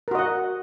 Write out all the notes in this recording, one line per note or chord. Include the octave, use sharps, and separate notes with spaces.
F#4 A#4 D#5 F#5